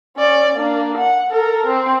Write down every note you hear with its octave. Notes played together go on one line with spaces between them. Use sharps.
C#4 D5
A#3 D4
F#5
A4 A#4
C4